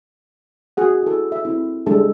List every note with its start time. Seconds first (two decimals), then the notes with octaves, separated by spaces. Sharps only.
0.77 F#4 G#4 F#5
1.03 E4 A4
1.32 E5
1.45 C4 E4
1.86 G3 G#3 D4 A4